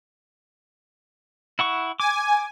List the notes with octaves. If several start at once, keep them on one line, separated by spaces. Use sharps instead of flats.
E4 F#5 C#6
G#5 D6